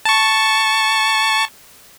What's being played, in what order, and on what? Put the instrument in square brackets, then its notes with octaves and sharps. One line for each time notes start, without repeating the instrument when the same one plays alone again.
[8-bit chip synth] A5 C#6